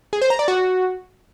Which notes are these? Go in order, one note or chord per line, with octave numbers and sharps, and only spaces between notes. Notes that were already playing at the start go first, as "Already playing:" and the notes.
G#4
C5
A#5
D5
F#4